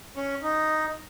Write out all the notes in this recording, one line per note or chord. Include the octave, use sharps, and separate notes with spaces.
C#4
D#4